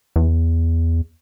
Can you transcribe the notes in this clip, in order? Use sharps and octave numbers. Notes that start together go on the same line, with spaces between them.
E2